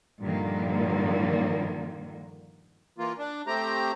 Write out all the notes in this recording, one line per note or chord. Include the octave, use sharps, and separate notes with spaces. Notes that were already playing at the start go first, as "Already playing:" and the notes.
G2 A#2 D3 D#3 F3 A#3
E3 A#3 F4
D4
A3 C4 G4 A#5